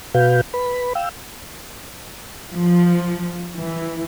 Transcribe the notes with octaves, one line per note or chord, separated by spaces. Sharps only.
B2 F#4 B4 F5 G6
B4 B5
F5 G5 E6
F3
E3